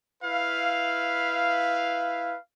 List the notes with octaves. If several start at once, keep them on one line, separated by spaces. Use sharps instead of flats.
E4 B4 F5